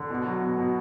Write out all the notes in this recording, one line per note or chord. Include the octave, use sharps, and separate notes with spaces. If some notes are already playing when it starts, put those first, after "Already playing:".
Already playing: D3
B2
F#3
B2
B2